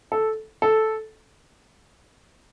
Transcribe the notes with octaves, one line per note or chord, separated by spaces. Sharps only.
A4
A4